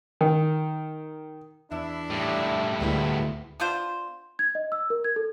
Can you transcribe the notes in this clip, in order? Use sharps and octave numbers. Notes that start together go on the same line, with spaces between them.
D#3
E2 D4 E4
A2 G3
D2 G#3 B3 E4
B3 D4 F4 C5
G#6
D#5
E6
A#4
G#6
A4